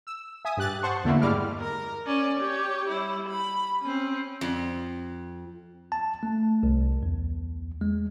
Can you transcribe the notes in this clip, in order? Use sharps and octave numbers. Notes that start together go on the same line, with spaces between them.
E6
E5 G#5 D#6
G2 G4 F#6 A6
C5 F#5 A5 C6 C#6
E2 D3 A3 A#3 E4
G2 G3 G#3 E4 D6 F6
A#4
C#4 D5
G4 C#5
G3 E4
B5
C4 C#4
F2
A5
A3
C2
E2
G#3